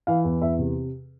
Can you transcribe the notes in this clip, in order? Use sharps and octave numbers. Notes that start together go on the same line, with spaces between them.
E3 F5
E2
E2 E5
C3